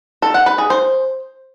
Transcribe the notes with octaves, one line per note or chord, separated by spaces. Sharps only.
A4
F#5
B4
G#4
C5